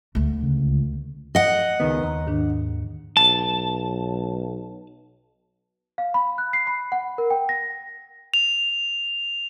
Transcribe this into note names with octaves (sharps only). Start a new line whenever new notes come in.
D2 A3
C#2
D#5 F#5
C#2 D#3 B3
D#2 A#5
G#2 D#3 D4
B1 A5
F5
B5
F#6
C7
B5
F#5
A#4
G5
A#6
F7